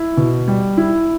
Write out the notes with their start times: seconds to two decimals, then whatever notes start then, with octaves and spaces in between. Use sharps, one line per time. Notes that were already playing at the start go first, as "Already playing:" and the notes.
Already playing: E4
0.17 B2
0.48 G3
0.77 E4